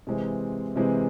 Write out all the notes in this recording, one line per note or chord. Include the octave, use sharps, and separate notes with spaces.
C3 E3 G#3 C4
C3 E3 G#3 C4